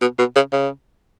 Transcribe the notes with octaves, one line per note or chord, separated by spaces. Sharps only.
B2
B2
C#3
C#3